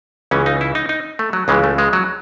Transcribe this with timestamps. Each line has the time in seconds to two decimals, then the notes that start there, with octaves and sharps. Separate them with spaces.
0.31 C#2 C#3 E3 C#4
0.46 D#4
0.61 E4
0.75 D#4
0.89 D#4
1.19 A3
1.33 F#3
1.48 C#2 C#3 E3 G#3
1.64 A3
1.78 G#3
1.93 F#3